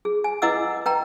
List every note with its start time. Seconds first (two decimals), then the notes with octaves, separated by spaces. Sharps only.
0.05 G#4
0.24 G#5
0.42 E4 B4 D#5 F#5 D6 E6
0.86 B4 G5 A#5